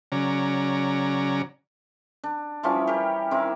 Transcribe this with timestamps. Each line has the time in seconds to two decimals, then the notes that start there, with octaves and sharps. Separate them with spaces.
0.12 C#3 F#3 C#4 D5 A#5
2.24 D4
2.63 E3 F3 G3 C#4
2.87 G4 A#4
3.31 D#3 C4 E4 A#4